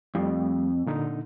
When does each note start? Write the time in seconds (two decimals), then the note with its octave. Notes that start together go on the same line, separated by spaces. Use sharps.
0.15 F2 G3 A3
0.86 A#2 D3 D#4